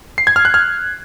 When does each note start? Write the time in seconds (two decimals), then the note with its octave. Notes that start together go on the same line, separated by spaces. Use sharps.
0.18 C7
0.27 G#6
0.36 F6
0.45 F#6
0.54 F6